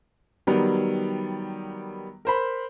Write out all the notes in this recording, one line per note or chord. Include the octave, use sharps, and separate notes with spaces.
D#3 F#3 G3 B3
A#4 C5 B5